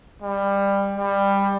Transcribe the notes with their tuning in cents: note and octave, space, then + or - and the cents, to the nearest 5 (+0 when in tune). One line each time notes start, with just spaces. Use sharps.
G3 +20
G3 +15